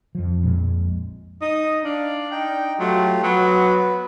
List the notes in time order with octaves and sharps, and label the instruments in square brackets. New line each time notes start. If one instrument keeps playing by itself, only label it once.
[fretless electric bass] F2 F3
A#1 F2 A#2 G#3
[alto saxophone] D#4 [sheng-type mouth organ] D#6
[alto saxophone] D4 [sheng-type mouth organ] F5
[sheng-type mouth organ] D#4 G5
[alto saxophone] F#3 [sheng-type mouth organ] A3 F4 G4
[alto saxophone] F#3 [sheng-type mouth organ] B3 B4